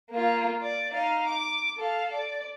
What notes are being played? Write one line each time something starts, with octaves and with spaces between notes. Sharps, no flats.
A#3 F4
D5
D#4 F5
D6
A4 F5
D5